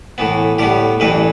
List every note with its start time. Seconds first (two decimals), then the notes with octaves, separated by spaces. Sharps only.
0.18 A2 E3 B3
0.58 A2 G3 B3 G4
1.00 A1 G2 E3 B4